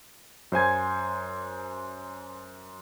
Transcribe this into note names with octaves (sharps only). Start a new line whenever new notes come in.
F#2 C5 G#5 G#6